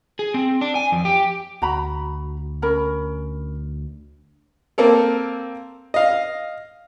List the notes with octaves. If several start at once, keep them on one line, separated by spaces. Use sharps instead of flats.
G#4
C4
D4
G#5
F2
G4
D2 F#4 A#5 B5
C#4 A#4 B5
A#3 C4 A4 A#4
D#5 F5